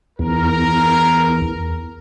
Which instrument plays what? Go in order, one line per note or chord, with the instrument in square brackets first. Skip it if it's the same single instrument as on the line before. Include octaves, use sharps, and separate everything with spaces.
[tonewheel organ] E2 [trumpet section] A#4